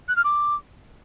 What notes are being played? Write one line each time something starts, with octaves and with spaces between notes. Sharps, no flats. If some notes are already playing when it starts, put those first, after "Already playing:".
F#6
F6
D6